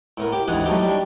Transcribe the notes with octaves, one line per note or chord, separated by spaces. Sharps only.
A2 B3 A#4
G4
D2 G#2 E3 F#5 G#5 D#6
F#3 A3 B3 D#4 G4
G3 D4